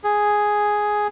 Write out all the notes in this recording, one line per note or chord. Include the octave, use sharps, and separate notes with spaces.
G#4